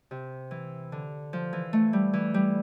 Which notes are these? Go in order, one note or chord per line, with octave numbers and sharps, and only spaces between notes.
C3
E3
D3
F3
E3
A3
G3
E3
G3